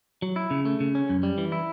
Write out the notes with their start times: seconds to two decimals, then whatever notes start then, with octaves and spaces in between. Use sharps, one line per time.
0.22 F#3
0.36 E4
0.51 C#3
0.65 A3
0.80 C#3
0.95 C#4
1.09 F#2
1.23 G3
1.38 E3
1.52 E4